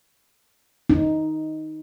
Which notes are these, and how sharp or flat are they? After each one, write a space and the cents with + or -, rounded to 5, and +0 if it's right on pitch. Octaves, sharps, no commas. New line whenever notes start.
D#4 +5